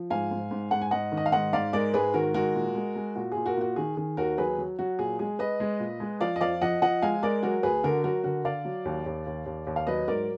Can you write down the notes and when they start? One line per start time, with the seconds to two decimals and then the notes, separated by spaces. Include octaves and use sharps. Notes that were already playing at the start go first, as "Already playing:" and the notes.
Already playing: F3
0.10 G#2 F5 G#5
0.31 G#2
0.51 G#2
0.71 G#2 F#5
0.81 G#5
0.91 G#2 D#5 F#5
1.12 D#3
1.17 D#5
1.26 F5
1.32 G#2 D#5 F#5
1.53 G#2 D5 F5
1.73 G#3 A#4 D5
1.94 G#2 G#4 B4
2.14 D#3 F#4 A#4
2.34 G#3 F#4 A#4
2.55 A#2
2.75 G#3
2.96 G#3
3.16 A#2 F#4
3.32 A#2 G#4
3.46 F#4 A#4
3.57 A#2 F#4
3.76 D#3 G#4
3.97 D#3 G#4
4.17 D#2 F#4 A#4
4.38 F#3 G#4 B4
4.58 F#3
4.79 F#3 F#4
4.99 A#2 G#4
5.19 G#3 G#4
5.39 G#3 B4 D#5
5.60 G#3
5.80 A#2
6.00 G#3
6.20 F3 D5 F5
6.36 D#5
6.41 F2 D5 F5
6.62 F3 D#5 F#5
6.82 F3 D#5 F#5
7.02 G#3 F5 G#5
7.22 G#3 A#4 D5
7.43 F#3 F#4 A#4
7.63 D2 G#4 B4
7.83 D3 F#4 A#4
8.04 F#3 F#4 A#4
8.24 D3 F#4 A#4
8.45 D3 D5 F5
8.65 F#3
8.85 D#2
9.06 D#2
9.26 D#2
9.46 D#2
9.67 D#2
9.76 F5
9.87 F#3 B4 D#5
10.08 G#2 A#4 D5